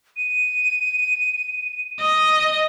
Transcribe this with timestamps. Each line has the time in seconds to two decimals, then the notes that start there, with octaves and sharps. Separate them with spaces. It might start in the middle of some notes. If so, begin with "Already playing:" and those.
0.16 D#7
2.00 D#5